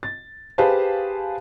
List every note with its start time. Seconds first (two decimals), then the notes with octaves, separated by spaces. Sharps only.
0.03 A6
0.58 G4 G#4 B4 C5 F5 A5